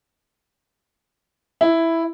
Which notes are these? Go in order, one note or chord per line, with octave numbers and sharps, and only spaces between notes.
E4